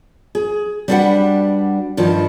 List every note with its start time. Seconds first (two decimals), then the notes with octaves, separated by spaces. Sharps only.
0.35 G#4
0.88 G3 B3 D4 F#4 B4 F#5
1.97 G2 D#3 F3